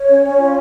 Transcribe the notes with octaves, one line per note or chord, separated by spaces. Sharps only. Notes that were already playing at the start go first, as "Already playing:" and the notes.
Already playing: C#5
C#4
C#4
F4